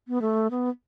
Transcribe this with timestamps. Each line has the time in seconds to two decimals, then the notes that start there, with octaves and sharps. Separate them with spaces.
0.08 B3
0.22 A3
0.51 B3